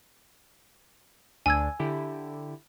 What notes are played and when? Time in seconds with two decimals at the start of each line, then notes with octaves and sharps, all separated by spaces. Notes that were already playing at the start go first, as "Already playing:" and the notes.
1.46 D2 D4 G#5 E6 G#6
1.79 D3 E4 G4